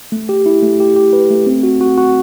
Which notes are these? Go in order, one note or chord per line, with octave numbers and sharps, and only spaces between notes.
A3
G4
E4
A3
G4
G4
B4
A3
C4
F#4
F#4
F#4